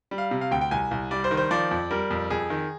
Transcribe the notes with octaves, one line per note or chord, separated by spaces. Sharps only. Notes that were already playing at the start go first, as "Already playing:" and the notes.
G3
F5
C3
F5
D2 G5
G5
C2 G#5
C2
G3 D5
C5
D#3
C5
F3 D5
F2
G3 A#4
F2
F2 G#4
D#3